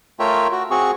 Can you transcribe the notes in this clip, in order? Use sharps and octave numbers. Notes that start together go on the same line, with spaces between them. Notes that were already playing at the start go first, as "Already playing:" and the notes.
A3 F4 A#4 C#5 E5 G5
F#4
C4 F#4 G#4 C#6